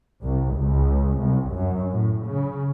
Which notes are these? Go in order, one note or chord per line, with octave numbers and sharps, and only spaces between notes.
C2
C#2
C2
F#2
A2
C#3